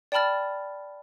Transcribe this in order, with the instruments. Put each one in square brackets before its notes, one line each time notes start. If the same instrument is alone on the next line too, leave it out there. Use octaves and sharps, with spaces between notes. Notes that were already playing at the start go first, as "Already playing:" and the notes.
[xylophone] D5 G5 A5 B5 F6 A6